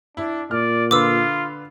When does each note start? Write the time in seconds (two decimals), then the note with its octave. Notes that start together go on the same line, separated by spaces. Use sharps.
0.17 D4 E4
0.51 A#2 D5 F6
0.91 D3 F4 B4 D6 E6